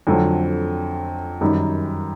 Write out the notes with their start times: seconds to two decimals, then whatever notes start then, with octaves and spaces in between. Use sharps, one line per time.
0.07 F2 D3 F#3 A3 C4
1.41 F#2 D#3 G3